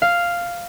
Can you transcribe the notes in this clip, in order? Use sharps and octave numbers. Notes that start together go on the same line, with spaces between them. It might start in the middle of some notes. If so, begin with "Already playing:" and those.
F5